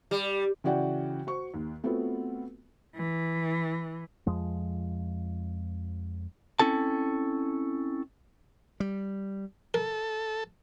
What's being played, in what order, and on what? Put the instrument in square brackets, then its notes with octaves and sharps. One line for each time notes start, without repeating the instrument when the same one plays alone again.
[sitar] G3
[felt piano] C#3 E3 F#4 D5 F#5 G5
F#4 C5 C#6
D#2
A3 B3 C4 F4 F#4 B4
[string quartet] E3
[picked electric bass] F2 F3 G#3
[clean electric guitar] C4 C#4 E4 A4 A5
[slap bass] G3
[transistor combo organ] A4 [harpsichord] A#4